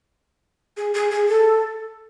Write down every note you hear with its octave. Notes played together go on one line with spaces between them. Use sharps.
G#4
G#4
G#4
A4